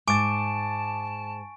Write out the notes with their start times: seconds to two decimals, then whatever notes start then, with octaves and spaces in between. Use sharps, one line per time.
0.08 G#2 G#5 A5 C#6 D6 A6 D7